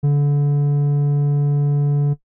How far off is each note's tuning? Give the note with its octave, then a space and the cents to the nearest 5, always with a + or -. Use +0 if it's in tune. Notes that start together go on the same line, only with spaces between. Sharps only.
D3 -30